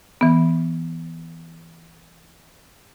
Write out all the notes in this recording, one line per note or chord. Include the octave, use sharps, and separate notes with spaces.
E3 B3